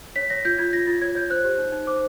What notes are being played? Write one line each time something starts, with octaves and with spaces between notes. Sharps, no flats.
C#5 B6
C#5 A#6
F4 G6
F4 G#6
F4 A#6
F4 A6
C#5 G#6
C#5 G6
C5 F#6
G4
D#4
D#4
C5 D6